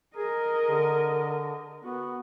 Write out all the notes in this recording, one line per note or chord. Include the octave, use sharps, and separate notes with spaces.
G#4 A#4 D#5
D3
B3 F#4